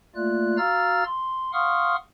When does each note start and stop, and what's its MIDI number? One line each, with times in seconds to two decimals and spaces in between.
0.16 0.58 57
0.16 0.58 58
0.16 0.58 65
0.16 0.58 74
0.16 0.58 90
0.58 1.04 66
0.58 1.04 77
0.58 1.04 82
0.58 1.04 88
0.58 1.04 89
0.58 1.04 93
1.05 1.52 84
1.53 1.96 77
1.53 1.96 78
1.53 1.96 84
1.53 1.96 85
1.53 1.96 87
1.53 1.96 89